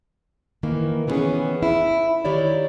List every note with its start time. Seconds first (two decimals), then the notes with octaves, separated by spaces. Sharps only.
0.63 D#3 E3 A#3
1.07 D#3 E3 G3 B3 C#4 G#4
1.63 E4
2.25 D#3 E4 G4 C#5 D5